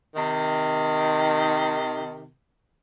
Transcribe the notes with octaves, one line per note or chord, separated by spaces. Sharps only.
C3 D#3